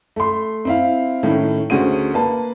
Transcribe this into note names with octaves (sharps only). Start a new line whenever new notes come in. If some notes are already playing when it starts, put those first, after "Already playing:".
A3 C6
C4 E4 F5
A2 D#3 C#4 E4
D2 C#4 F#4 G#4 C5 D#7
A#3 B4 A5